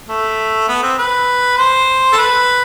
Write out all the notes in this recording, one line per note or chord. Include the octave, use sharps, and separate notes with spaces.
A3
B3
C4
B4
C5
A4
B4